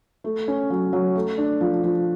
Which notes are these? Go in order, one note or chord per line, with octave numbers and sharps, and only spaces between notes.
A3
C#4
F#3
F#3
A3
D4
F3
F3